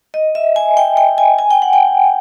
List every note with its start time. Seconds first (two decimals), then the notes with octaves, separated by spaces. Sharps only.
0.14 D#5
0.35 E5
0.56 G#5
0.77 G5
0.97 G5
1.18 G#5
1.39 G#5
1.51 G5
1.62 F#5
1.73 G5